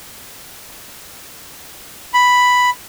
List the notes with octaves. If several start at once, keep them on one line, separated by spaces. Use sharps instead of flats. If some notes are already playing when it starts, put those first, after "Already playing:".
B5